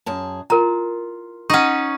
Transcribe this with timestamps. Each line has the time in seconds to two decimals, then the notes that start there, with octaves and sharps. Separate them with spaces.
0.06 F#2 G#4 A5
0.50 F4 A#4 A#5
1.50 C#4 D#4 F#5 C#6